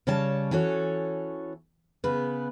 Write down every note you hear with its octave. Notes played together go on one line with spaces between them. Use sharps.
C#3 G3 C#4 C#5 A5
E3 C#4 F#4 A4 C#5
C#3 B3 B4